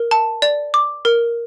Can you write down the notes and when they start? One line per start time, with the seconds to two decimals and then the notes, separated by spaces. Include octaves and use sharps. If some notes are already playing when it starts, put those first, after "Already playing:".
Already playing: A#4
0.11 A5
0.42 D5
0.74 D6
1.05 A#4